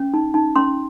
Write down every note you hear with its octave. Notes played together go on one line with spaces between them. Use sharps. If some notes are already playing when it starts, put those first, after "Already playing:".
Already playing: C#4
D#4
D#4
C#4 C6